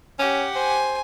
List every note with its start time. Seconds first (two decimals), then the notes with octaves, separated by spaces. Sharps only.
0.19 C#4 G4 F#5
0.56 C5 G#5